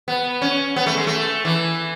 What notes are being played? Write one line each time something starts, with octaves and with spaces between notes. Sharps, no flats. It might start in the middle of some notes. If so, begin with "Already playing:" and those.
B3
C#4
B3
A3
G#3
A3
E3